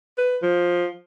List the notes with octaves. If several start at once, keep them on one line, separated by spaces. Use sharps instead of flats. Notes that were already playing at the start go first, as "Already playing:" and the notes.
B4
F3